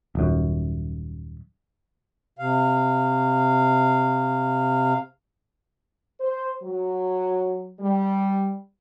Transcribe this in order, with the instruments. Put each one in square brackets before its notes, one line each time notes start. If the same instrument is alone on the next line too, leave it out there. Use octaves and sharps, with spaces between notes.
[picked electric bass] D#1 F#2
[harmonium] C3 F5
[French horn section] C5
F#3
G3